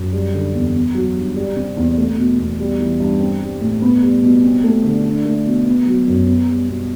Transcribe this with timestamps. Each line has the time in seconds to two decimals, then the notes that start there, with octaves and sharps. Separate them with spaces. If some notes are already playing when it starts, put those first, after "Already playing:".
Already playing: F#2
0.13 G3
0.34 D3
0.54 E2
0.74 B3
0.95 F#3
1.16 G2
1.36 G3
1.56 C3
1.77 E2
1.97 A3
2.18 B2
2.38 E2
2.59 G3
2.80 E3
3.00 G2
3.20 C4
3.41 G3
3.61 A2
3.82 B3
4.02 G3
4.23 B2
4.44 C4
4.64 A3
4.85 D3
5.05 D4
5.25 A3
5.46 B2
5.66 B3
5.87 F#3
6.08 F#2
6.28 B3
6.49 G3
6.69 B2